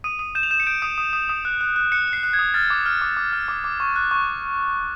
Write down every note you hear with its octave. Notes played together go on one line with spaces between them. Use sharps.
D#6 D#7
D#6
G6 E7
F7
G6 E7
C#7
G6 D7
D#6
D#6
D#6
D#6
F#6
F#6
F#6
F#6 C#7
F#6
C7
F#6
G#6
D#6
F6 A6
D6
F6
D6
D6
F6
D6
D6
C#6
F#6
C#6